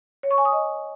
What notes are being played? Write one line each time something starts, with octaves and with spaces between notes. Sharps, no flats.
C#5
C#6
G#5
D#6
D#5